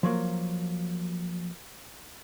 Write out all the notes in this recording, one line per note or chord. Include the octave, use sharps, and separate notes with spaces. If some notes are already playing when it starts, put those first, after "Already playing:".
F3 F#3 A#3